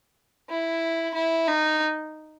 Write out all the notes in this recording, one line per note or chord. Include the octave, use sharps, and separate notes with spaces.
E4
E4
D#4